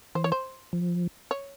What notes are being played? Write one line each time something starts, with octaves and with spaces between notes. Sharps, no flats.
E3 C5
C#5
C5
F3
C#5